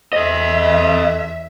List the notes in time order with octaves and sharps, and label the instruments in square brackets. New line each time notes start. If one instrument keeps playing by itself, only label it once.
[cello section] E2 E5 [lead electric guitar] A4 D#5